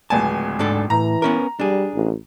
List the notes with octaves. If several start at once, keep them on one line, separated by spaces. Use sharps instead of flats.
D1 C#2 G#5 A5
G#2 D4 A4
A2 E3 A#5
B3 C#4 A#4
G3 D4 G#4
A1